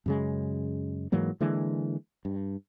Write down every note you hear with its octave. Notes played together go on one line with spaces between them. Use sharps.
F#2 C#3 G#3
G#2 E3 F#3 A#3
D3 E3 G#3 A#3
G2